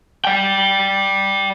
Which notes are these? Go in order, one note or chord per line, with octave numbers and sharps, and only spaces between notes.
D5 G5